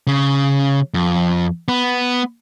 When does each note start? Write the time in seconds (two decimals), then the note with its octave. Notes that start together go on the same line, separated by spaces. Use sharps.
0.07 C#3
0.94 F2
1.68 B3